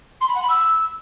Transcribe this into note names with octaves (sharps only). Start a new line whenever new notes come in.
C6
B5
F#5
B5
E6